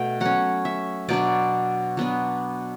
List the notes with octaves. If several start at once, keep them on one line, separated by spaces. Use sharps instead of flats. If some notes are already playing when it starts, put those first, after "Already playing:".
Already playing: B2 A3 G5
F#3 C#4 F#5
E5
B2 F#3 B3 D4 D5
F#3 B3 D4